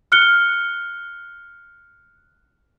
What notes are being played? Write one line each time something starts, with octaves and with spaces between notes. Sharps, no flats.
F6 F#6 C#7 G7